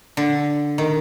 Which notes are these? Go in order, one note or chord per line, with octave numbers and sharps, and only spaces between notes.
D3
D#3